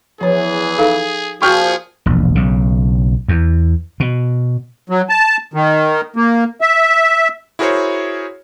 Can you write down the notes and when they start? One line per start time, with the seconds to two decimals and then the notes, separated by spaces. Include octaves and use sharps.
0.21 E2 E3 F3 G#4 C#5
0.78 D#4 A4 F5
1.42 A#2 F3 F#4 G#4 G5 C#6 F6 G6
2.06 E1 A#1
2.35 B1 C#3
3.28 E2
4.00 B2
4.90 F#3
5.09 A5
5.54 D#3
6.16 A#3
6.61 E5
7.59 E4 F#4 G#4 A#4 C5 C#5